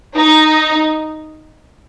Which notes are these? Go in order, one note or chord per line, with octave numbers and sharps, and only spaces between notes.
D#4